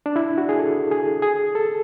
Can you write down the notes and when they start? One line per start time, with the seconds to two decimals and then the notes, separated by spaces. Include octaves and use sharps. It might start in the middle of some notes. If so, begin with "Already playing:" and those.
0.06 D4
0.16 E4
0.38 F#4
0.49 G#4
0.59 A4
0.91 G#4
1.22 G#4
1.55 A4